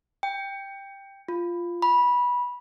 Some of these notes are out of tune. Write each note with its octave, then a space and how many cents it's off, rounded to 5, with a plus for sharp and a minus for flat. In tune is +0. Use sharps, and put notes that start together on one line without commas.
G5 +10
F4 -5
B5 -15